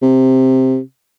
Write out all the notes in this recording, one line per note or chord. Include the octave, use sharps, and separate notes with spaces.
C3